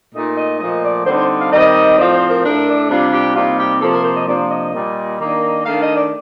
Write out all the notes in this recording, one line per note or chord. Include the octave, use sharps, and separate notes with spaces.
A#2 A3 D#4 D#5
D#5
A#2 F3 A3 D#5
D5
D3 G3 C4 D#4 C5
C5
F5
D#3 G3 C4 D#4 D#5
A2 F3 C4 F4 D5
C5
A#4
A2 A3 D4 A#4
D5
C3 G3 D4 F4 G4
G4
C3 G3 A#3 D#4 F4
G4
C3 F3 A#3 A4
A#4
C5
D#5
C3 F3 A#3 D4 D5
D#5
A#2 G3 A#3
D#3 A#3 D4
D#3 A3 D4 F5
D#5
D5